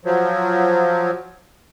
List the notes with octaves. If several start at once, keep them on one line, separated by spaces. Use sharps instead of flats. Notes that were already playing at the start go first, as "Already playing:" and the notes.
F3 F#3